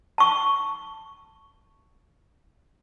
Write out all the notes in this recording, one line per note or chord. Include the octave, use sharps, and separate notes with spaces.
A5 C#6